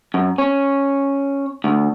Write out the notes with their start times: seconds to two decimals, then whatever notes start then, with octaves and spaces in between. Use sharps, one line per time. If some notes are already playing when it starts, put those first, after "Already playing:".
0.14 F#2
0.38 C#4
1.64 D2